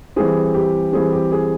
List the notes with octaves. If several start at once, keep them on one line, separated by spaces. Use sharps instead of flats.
E3 G3 C4 G#4
G4
E3 G3 C4 G#4
G4
G#4